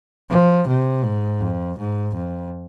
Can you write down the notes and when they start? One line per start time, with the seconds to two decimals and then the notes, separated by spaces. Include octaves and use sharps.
0.30 F3
0.68 C3
1.04 G#2
1.41 F2
1.78 G#2
2.15 F2